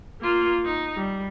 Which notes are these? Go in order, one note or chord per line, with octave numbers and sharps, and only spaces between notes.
A#3 F4
D#4
G3